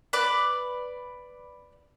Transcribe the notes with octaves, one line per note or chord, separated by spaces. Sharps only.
B4 D5 D6